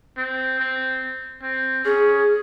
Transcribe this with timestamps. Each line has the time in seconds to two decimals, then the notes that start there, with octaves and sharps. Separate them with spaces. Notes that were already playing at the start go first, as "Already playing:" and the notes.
0.17 C4
0.59 C4
1.43 C4
1.85 C#4 G#4